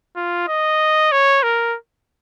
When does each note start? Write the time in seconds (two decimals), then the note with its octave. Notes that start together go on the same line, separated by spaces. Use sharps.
0.16 F4
0.48 D#5
1.12 C#5
1.43 A#4